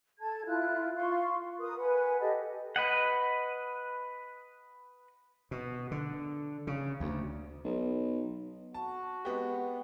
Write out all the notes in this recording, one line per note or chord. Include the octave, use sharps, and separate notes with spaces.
A4 A5 G#6
E4 F4 F#6
F4 F5 C6 C#6
A#4 B4 D#6
B4 F#5 G#5
G4 A4 D#5
B4 D#5 F#5
B2
D3
C#3
D2
B1
F#4 A5
G#3 B3 G4